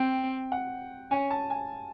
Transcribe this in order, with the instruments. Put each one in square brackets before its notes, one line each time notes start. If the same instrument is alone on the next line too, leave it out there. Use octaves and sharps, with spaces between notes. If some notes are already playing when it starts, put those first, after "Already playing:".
Already playing: [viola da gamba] C4 [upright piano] G5
[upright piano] F#5
[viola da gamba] C#4 [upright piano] G#5
[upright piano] A5
G#5